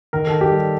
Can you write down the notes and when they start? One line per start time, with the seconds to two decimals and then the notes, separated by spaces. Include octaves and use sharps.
0.13 D#3 A#4
0.27 D#3 A4
0.41 G4
0.50 G3